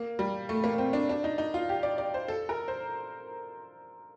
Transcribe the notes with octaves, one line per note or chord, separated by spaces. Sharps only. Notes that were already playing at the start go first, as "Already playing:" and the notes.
Already playing: A#3
G3
A3
A#3
C4
D4
D4
D#4
D#4
F4
G4
D5
D5
C5
A4
A#4
C5